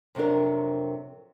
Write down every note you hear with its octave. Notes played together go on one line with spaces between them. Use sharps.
F2 C3 F#3 D4 A#4